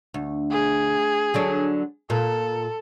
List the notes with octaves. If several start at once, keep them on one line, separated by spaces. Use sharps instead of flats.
D2
G#4
D3 F#3 D4
A#2 A4